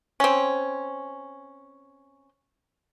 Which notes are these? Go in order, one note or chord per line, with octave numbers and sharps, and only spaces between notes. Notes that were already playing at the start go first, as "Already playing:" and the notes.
C4 C#4